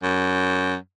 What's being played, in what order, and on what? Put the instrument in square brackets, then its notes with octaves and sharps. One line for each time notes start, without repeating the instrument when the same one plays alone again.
[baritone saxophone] F#2